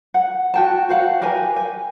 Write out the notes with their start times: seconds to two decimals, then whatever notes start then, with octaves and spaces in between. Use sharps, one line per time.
0.14 F#5
0.54 F#4 G5 A5
0.89 F#4 C5 F5 F#5
1.22 G4 A#4 B4 G#5
1.56 G#5